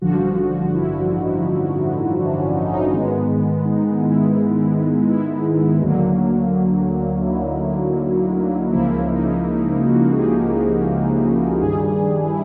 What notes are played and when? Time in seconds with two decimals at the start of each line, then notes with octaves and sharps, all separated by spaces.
0.02 A1 G2 D3 F3 F#4
0.74 E4
1.11 D#4
2.19 D4
2.37 C#4
2.55 D#4
2.74 D#4
2.93 G#2 D#3 G#3 B3
3.65 D#4
4.00 E4
5.09 E4
5.82 D2 D3 F#3 A#3
7.21 E4
7.28 D#4
8.72 C#2 C#3 F3 A#3 E4
9.08 D#4
9.45 E4
9.81 F#4
10.13 G#4
10.18 G4
11.62 G2 D#3 G3 G#4
11.99 D4
12.24 E4